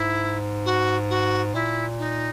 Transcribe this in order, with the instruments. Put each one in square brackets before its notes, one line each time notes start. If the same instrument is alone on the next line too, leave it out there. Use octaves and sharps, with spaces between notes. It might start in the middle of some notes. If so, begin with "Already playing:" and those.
Already playing: [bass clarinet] G#2 [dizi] E4
[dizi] F#4
F#4
[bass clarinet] A#2 [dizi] E4
[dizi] D#4